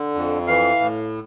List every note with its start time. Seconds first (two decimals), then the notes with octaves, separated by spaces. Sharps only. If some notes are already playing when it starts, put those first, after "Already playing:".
Already playing: D3
0.15 F2
0.47 E3 F5
0.80 A2